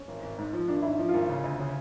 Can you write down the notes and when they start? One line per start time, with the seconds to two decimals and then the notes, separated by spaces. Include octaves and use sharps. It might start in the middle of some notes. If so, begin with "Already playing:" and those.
Already playing: C#4
0.08 G#1
0.23 G#1
0.38 G#2
0.53 F3
0.68 G#1 D4
0.82 G#1 E4
0.88 D#4
0.99 F3
1.09 F4
1.14 G#1
1.28 C#3
1.44 D2
1.60 C#3